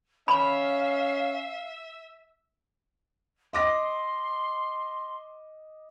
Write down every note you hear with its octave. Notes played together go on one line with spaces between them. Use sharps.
C#4 E5 F5 B5
D#5 C6 D6 A#6